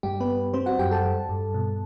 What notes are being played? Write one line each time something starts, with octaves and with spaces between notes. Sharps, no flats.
G2 G3 G4
B3 B4
G2
G3 C4 C5
F#4 F#5
F#2 G4 G5
A4 A5
G3
G2
B2